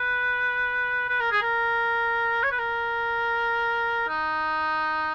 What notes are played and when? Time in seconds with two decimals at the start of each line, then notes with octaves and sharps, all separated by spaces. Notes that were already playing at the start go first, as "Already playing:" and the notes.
Already playing: B4
1.09 B4
1.20 A#4
1.31 G#4
1.42 A#4
2.43 C#5
2.51 B4
2.58 A#4
4.08 D#4